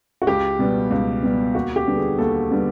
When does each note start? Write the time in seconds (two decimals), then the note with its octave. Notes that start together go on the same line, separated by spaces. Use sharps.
0.22 F#4
0.27 C#2 G4
0.59 B2 G3 B3
0.91 C#2
1.23 B2 G3 B3
1.55 D#2 F#4
1.76 G4
1.86 D3 G3 B3
1.97 G#4
2.18 D#2 A4
2.51 D3 G3 B3